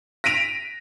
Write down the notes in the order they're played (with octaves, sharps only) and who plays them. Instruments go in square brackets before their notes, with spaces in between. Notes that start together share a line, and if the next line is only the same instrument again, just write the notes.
[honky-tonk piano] A#6 B6 D7 D#7 F7